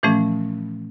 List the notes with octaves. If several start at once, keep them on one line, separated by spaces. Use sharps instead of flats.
A#2 E3 F3 A3 C#4